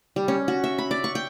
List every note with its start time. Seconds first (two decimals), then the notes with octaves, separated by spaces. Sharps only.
0.16 G3
0.28 C#4
0.48 F#4
0.64 E5
0.78 B5
0.91 D5
1.04 C#6
1.15 G5